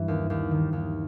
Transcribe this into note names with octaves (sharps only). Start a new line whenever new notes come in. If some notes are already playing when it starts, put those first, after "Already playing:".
Already playing: G2 E3
D#2
D#2
D#3
D#2